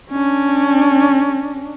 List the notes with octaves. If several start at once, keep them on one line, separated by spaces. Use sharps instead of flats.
C#4 D4